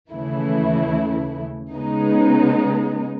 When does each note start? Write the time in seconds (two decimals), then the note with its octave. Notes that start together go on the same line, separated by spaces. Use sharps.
0.12 D#2 C#3 E3 A3 E4
1.75 C#3 G#3 B3 D#4